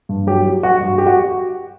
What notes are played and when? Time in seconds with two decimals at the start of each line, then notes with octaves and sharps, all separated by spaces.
0.09 G2
0.27 F#3 G4
0.46 F#3
0.63 F#3 F#4
0.81 G2
0.98 G4
1.07 F#4